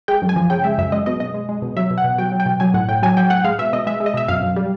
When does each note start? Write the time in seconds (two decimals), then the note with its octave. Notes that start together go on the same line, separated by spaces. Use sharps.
0.08 G#3 G5
0.22 F#2
0.29 G#5
0.36 F3
0.50 C#3 G5
0.64 G#3 E5
0.78 F#2 E5
0.92 G#3 D#5
1.06 B2 D#5
1.20 B2 D#5
1.34 G#3
1.49 G#3
1.62 B2
1.77 F#3 E5
1.91 B2
1.98 F#5
2.04 B2
2.18 F#3 G5
2.32 F#3
2.40 G5
2.46 B2
2.60 F#3 G#5
2.74 A2 F#5
2.89 A2 G5
3.03 F#3 G#5
3.17 F#3 G5
3.30 A2 F#5
3.44 G#3 F5
3.59 B2 E5
3.73 B2 D#5
3.87 G#3 E5
4.00 G#3
4.06 D#5
4.14 B2 E5
4.28 F#2 F5
4.43 F#2
4.56 G3